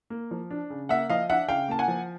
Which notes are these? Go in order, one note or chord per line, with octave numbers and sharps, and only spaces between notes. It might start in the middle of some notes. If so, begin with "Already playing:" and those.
A#3
F3
D4
C#3
A#3 E5 F#5
F3 D#5 F5
D4 E5 F#5
C#3 F5 G5
A#3 A5
F#5 G#5
F3